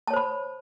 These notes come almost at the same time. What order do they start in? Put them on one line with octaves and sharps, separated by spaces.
A5 C#5 C5 B5